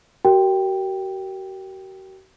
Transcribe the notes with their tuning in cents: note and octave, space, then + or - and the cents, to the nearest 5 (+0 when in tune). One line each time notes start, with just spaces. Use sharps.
F#4 +45 A#4 +0 G5 +0